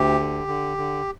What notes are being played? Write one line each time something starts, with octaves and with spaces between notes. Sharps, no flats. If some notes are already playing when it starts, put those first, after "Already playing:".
Already playing: D2 G4
D3
D3
D3